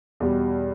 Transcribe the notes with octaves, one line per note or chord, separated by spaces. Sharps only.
E2 B2 G3